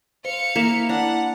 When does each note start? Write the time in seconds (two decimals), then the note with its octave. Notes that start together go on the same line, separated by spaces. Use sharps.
0.25 C5 F5 C#7
0.56 A#3 E4 F7
0.89 D4 F#5